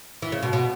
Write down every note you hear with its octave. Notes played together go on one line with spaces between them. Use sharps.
E3
C#3
B2
B2